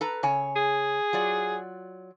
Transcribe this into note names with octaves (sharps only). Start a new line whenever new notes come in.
A4 B4 A#5
C#3 C#5 G#5
G#4
F#3 F4 D5